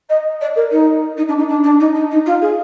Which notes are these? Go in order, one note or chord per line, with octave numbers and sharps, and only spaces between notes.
D#5
D5
A#4
D#4
D#4
D4
D#4
D4
D4
D#4
D#4
D#4
F4
G#4